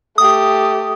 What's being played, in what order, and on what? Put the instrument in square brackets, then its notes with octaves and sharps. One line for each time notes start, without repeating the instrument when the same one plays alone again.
[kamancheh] A3 G4 [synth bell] D#6